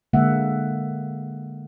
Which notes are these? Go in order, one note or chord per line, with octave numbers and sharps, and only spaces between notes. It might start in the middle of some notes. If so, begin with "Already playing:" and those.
D3 G#3 A#3 E5 F#5